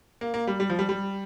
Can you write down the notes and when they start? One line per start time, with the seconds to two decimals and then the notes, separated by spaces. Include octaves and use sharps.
0.21 A#3
0.34 A#3
0.47 G3
0.60 G3
0.70 F3
0.79 G3
0.89 G3